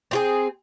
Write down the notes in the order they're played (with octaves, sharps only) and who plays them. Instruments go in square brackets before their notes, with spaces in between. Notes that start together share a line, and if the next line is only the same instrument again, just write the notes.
[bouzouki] C4 F4 G#4